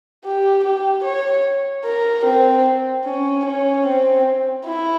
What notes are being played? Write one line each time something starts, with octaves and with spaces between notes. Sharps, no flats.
G4
G4
C#5
A#4
C4
C#4
C#4
C4
E4